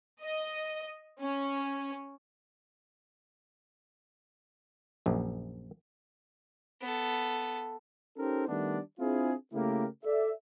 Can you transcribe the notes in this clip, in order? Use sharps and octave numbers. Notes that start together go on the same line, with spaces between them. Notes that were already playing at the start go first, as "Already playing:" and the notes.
D#5
C#4
A#1 F#2
B3 A4
C#4 D#4 G4 A4 A#4 C5
D#3 G3 A3 B3 D4
C4 D4 E4 F4 G#4
C#3 A3 A#3 E4 G4 A#4
A4 D5 E5